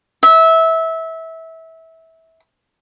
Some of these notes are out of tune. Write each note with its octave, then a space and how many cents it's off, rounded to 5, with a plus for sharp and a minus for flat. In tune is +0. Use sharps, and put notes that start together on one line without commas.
E5 -20